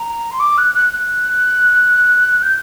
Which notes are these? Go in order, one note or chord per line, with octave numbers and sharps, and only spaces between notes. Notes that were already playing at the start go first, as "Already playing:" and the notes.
Already playing: A#5
C6
D6
F#6
F#6
F#6
G6